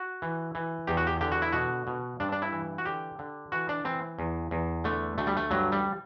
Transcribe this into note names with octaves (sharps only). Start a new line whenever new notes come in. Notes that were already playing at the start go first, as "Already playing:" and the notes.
Already playing: F#4
E3
E3
E2 G4
F#4
G4
D3 G4
F#4
E4
B2 F#4
B2
G2 D4
D4
E4
E3
F#4
D3 G4
D3
E3 F#4
D4
E3 C4
E2
E2
D3 A3
D2 A3
G3
A3
G2 F#3
G3